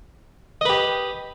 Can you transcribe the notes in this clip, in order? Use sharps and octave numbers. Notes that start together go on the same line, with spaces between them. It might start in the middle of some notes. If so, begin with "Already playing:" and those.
G4 B4 D#5